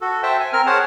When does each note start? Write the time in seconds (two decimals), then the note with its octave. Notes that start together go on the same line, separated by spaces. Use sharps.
0.01 F#4 A4
0.23 C5 E5 G5 A5
0.40 G#5
0.53 C4 A#4 F6
0.66 G#4 C5 C#5 F#5 A5